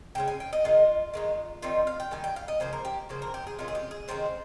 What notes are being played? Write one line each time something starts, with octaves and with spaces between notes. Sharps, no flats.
C#3 G#3 C#4 G5
G#5
G5
D#5
D#3 G#3 D#4 F4
D#3 G#3 D#4
D#3 G3 C4 D#4 F4
F5
G5
D#3 G3 G#5
G5
F5
D#5
C#3 F3 A#3 C5
A#4
G4
C#3 F3 A#3 C5
A#4
G4
G#4
C3 D#3 G#3 C#4 F4
G#4
G4
G#4
C3 D#3 G#3 C#4 C5